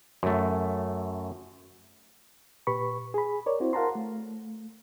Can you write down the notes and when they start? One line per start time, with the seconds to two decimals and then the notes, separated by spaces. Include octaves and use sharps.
0.23 F#2 A3
2.67 A#2 G4 B4 B5 C#6
3.14 G#4 B5
3.46 A#4 C#5 D5
3.60 C4 E4 F#4 C5
3.73 A#4 F5 F#5 A5 A#5 C6
3.95 A3